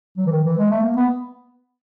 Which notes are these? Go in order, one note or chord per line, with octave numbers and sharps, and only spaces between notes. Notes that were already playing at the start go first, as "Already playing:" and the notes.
F#3
E3
D#3
E3
G#3
A3
A#3
B3